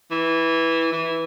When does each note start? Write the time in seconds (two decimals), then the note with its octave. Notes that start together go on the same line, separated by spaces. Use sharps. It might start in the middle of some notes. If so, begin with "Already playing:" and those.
0.11 E3
0.92 E3